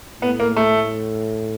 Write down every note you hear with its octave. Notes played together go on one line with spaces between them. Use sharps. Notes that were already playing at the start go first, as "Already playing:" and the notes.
A2 B3
A#3
A3